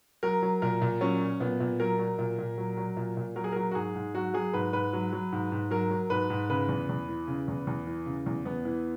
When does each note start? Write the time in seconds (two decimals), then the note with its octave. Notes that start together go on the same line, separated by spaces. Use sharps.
0.23 F#3 A#4
0.42 F#3
0.62 A#2 A#4
0.82 A#2
1.01 F#3 C#4
1.21 F#3
1.40 A#2 B3
1.60 A#2
1.80 F#3 A#4
1.99 F#3
2.19 A#2
2.38 A#2
2.58 F#3
2.77 F#3
2.97 A#2
3.17 A#2
3.36 F#3 A#4
3.44 G#4
3.52 F#3 A#4
3.71 F#4
3.75 G#2 G#4
3.95 G#2
4.14 F#3 F#4
4.34 F#3 G#4
4.53 G#2 B4
4.73 G#2 B4
4.93 F#3
5.12 F#3
5.32 G#2
5.52 G#2
5.71 F#3 A#4
5.90 F#3
6.10 G#2 B4
6.30 G#2
6.49 C#3 B4
6.69 E2
6.89 E2
7.09 E3
7.28 C#3
7.48 E2
7.67 E2
7.87 E3
8.06 C#3
8.26 E2
8.45 E2 B3
8.65 E3